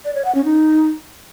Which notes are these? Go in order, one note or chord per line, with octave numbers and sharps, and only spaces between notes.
D5
C#5
F#5
C#4
D#4